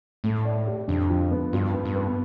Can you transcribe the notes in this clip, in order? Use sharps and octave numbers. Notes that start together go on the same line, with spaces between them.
A2 A3
D5
G4
F2 D3
F3
B3
G2 F4
B3
G2
B3